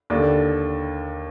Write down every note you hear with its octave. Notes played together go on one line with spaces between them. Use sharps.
D#2 D3 D5